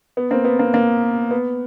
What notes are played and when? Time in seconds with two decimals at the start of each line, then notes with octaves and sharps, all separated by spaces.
0.17 B3
0.31 A#3 C4
0.45 B3
0.59 A#3
0.74 A#3
1.31 B3